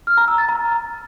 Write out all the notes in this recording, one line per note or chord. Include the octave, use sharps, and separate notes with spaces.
F6
A#5
E6
A6
A#5